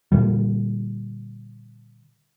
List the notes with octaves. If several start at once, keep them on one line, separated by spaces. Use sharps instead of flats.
A#2 D3 G3